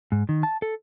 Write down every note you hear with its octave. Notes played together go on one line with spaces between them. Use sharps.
G#2
D#3
A5
A4